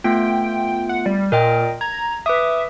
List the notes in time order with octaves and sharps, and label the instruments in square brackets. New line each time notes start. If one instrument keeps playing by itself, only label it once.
[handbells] A3 B3 F4 [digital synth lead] G5
[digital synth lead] F#5
G3
[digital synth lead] A#2 [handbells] A#4 D#5 G5
[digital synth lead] A#5 [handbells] G#6
[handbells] B4 D6 D#6 [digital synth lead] E5